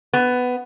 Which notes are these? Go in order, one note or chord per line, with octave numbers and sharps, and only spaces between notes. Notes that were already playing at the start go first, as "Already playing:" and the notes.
B3